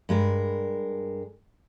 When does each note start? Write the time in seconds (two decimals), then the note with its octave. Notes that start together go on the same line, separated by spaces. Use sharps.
0.09 G2 G#3 A#4